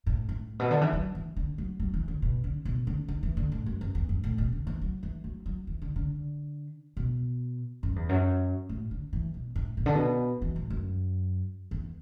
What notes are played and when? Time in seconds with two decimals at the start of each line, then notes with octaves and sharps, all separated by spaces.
0.07 A2
0.29 A2
0.59 B2
0.71 D3
0.81 E3
0.93 F#3
1.15 E3
1.37 D3
1.58 F#3
1.80 F#3
1.94 E3
2.08 D3
2.22 B2
2.44 D3
2.65 B2
2.87 D3
3.08 D3
3.23 E3
3.37 D3
3.52 A2
3.66 F#2
3.81 F#2
3.95 E2
4.09 F#2
4.24 A2
4.38 B2
4.52 D3
4.67 E3
4.82 F#3
5.03 E3
5.24 F#3
5.46 F#3
5.67 E3
5.82 D3
5.96 D3
6.97 B2
7.83 F#2
7.96 E2
8.09 F#2
8.69 A2
8.91 D3
9.13 E3
9.34 B2
9.56 A2
9.77 B2
9.86 D3
9.95 B2
10.42 E3
10.56 A2
10.70 F#2
11.71 E2